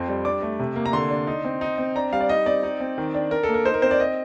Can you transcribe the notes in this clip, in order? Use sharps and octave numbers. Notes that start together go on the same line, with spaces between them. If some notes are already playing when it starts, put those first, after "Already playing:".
Already playing: F2 C4 C6
G3
D4 D6
A3
C3
A#3
A#5
D3 C6
D4
D#4
C4
D#4
C4
D4 A#5
G3 F5
D5
D#4 D#5
C4 D5
D#4
C4
D#3
D4
D4 A#4
A4
A#3
A#4
D#4 C5
A#4
C4 C5
D5
D#5